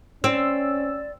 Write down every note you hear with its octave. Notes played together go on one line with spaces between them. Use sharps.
C4 C#4 D5 E6